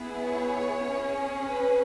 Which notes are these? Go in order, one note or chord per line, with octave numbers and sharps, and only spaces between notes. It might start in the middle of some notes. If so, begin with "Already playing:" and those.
Already playing: B3 E4 G#4
C#5
C#4 G#4
B4